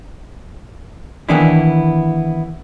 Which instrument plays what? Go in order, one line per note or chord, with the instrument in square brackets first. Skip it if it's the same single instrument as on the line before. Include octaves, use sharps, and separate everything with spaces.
[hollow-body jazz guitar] D#3 E3 A#3 B3 D4 E4